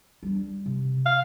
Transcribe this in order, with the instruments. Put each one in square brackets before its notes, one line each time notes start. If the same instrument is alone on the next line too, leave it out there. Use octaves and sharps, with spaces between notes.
[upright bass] G3 D4
C3
[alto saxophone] F5